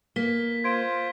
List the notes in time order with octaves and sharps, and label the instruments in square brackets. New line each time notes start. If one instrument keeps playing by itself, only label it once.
[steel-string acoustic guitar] A#3 [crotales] B6 G7
[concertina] F4 C5 [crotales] G#6 D7